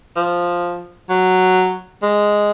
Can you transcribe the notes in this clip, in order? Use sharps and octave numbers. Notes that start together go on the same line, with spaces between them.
F3
F#3
G#3